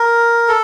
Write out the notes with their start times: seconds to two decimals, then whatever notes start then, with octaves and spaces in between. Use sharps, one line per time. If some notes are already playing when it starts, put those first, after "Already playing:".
Already playing: A#4
0.48 A4